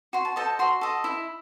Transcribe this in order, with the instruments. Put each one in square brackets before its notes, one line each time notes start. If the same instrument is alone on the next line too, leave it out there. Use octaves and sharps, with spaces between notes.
[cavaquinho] F#4 C6
A5
A4 C5 D#5 A5
F#4 C6
A4 D#5
E4